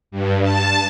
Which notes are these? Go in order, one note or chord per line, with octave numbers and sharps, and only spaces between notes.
G2
A5